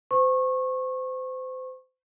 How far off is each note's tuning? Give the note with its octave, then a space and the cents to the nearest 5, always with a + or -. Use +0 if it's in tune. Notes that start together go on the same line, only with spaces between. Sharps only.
C5 -30 C#6 -25